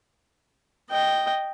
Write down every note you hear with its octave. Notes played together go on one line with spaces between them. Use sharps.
D#5 G5